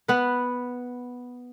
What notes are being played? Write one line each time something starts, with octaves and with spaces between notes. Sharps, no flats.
B3 B4